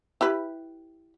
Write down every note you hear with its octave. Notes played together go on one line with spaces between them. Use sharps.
E4 G4 B4